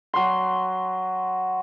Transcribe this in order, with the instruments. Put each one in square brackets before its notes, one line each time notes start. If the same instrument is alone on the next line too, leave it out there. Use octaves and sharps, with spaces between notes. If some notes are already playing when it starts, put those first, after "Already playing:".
[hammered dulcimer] F#3 C6